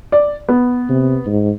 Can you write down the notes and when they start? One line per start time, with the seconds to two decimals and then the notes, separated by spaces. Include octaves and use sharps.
0.12 D5
0.49 B3
0.89 C3
1.26 G#2